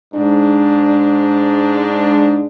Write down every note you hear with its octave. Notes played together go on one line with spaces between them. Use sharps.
G#2 D4